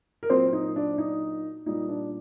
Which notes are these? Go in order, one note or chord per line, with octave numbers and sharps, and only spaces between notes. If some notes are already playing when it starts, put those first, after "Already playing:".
A#4
A#2 F#3 C4 C5
D#4
D4
D#4
A#2 G3 D#4
D4